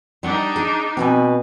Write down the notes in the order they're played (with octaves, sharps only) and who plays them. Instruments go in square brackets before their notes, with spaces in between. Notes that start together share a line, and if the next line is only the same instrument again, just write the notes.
[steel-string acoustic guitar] G3 F#5 A5 [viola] D4 D#4
[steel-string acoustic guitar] G#4
[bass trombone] B2 [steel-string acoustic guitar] C4 B4 G#5